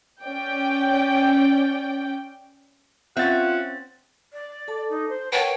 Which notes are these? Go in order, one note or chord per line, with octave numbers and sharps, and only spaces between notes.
C#4 D5 G5
C4 C#4 F4 E5 F#5 A6
D5
A4 A5 D6
D#4
C5
A#4 B4 C#5 F#5 G5 A5